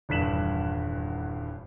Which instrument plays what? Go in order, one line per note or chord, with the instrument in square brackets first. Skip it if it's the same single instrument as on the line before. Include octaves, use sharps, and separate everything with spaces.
[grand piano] D#1 E2 G2 B6 E7 F#7